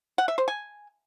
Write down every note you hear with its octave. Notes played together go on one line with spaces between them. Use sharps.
F#5
E5
C5
G#5